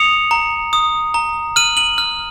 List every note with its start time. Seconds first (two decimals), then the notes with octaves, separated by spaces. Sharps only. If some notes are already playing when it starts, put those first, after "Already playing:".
Already playing: D#6 C#7 F7
0.31 A#5
0.73 D#6
1.14 A#5
1.56 F6 D#7 F#7
1.77 D#7 F#7
1.98 F6